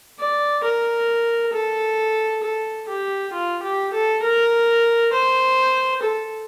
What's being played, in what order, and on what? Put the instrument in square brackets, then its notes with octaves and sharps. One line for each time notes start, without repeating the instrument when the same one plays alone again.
[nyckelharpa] D5
A#4
A4
A4
G4
F4
G4
A4
A#4
C5
A4